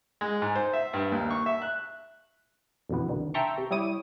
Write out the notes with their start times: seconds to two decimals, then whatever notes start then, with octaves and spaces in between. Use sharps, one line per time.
0.21 G#3
0.42 G#2
0.55 C5
0.73 E5
0.93 G2
1.12 D#2
1.30 C#6
1.46 E5
1.62 F#6
2.89 F2 B2 D3 E3 B3
3.08 C2 B2 D3 D#3
3.34 E5 G5 A5 A#5 C6 C#6
3.58 C3
3.71 G3 E4 C#5 D6 D#6 D#7